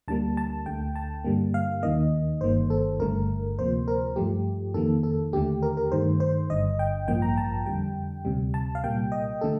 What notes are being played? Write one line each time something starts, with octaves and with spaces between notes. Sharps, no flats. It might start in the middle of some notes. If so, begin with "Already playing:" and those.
D2 D3 G3 A#3 A5
A5
D2 D3 A3 G5
A5
G2 D3 G3 A#3
F5
D#2 D#3 A#3 D#5
G1 G2 D#3 A#3 C5
A4
G1 G2 D3 A3 A#4
D2 C3 F3 A#3 C5
A#4
G2 F3 A3 G4
F2 D#3 A#3 A4
A4
D#2 D3 A3 G4
A#4
A#4
G2 D#3 A3 C5
C5
G1 G2 D3 D#5
G5
A1 G2 F3 A#3 G5
A#5
A5
F2 D3 G3 G5
D2 C3 G3
A5
F5
C2 A#2 G3 A#3 G5
D#5
D3 A3 A4